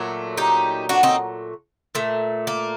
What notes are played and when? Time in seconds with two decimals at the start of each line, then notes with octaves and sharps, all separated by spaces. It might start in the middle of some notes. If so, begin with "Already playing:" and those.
Already playing: A#2 F#3 A3
0.37 D#4 G4
0.89 D4 F#4
1.03 C4 D#4
1.95 A#2 A3
2.47 A#3